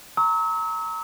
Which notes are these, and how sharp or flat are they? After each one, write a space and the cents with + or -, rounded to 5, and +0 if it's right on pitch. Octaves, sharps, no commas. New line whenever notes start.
A#5 -20 C#6 +0 E6 -40